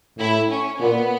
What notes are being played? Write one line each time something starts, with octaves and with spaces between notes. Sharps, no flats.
A2 E4
C#4
A#2 B3